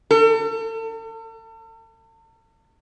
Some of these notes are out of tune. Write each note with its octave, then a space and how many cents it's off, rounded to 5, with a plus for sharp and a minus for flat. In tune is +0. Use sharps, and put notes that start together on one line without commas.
A4 +40